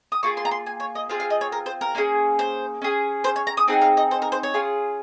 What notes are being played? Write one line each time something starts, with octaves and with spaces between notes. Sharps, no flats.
D#6
A#3 F4 G#4 C#6
C6
A#5
C6
G#5
C#5
D#5
C4 F4 G#4 F5
F5
D#5
C#5
A#4
C5
A#4
A#3 C#4 F4 G#4
C5
C#4 G#4
C5
C#5
A#5
D#6
C4 D#4 G#4 F#5
F5
D#5
C5
A#4
C5
C#5
C#4 F4 G#4